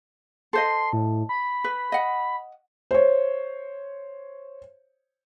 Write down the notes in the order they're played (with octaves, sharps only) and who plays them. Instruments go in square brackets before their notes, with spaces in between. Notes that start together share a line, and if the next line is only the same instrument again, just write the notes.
[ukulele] A4 C5 D#5 [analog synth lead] C6
[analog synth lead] A2
B5
[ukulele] B4
D#5 F#5
[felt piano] C5 C#5